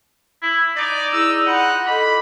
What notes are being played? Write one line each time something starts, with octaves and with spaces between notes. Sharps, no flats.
E4
D#4 D5
E4 G#4 D5 E6
F4 F#5 B5 C6
A4 D#5 B5 D6